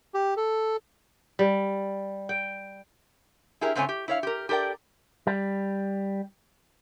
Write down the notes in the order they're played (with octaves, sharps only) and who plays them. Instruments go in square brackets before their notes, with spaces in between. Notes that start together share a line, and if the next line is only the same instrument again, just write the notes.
[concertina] G4
A4
[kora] G3
G5
[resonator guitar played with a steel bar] E4 G4 G#4 A#4
G#2 C#3 A3 C4 C#5 G#5
G4
E4 C#5 F5
G4 A#4
G4 A4 A#4 D5 G5
[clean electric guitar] G3